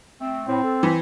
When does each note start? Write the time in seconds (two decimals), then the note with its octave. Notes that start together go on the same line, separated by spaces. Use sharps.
0.20 A3 C4
0.47 A2 C4
0.63 A4
0.83 E3 B5